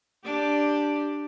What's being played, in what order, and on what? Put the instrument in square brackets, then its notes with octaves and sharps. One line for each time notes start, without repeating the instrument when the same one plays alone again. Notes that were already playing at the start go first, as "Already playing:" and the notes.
[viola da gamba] D4 G4